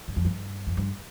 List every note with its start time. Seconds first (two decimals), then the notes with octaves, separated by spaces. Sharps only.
0.08 G2
0.16 F2
0.25 G2
0.67 F2
0.77 G2